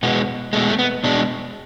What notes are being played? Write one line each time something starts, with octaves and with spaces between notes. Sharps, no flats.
B2 G#3 B3
B2 G#3 A3
A3
B3
B2 G#3 D4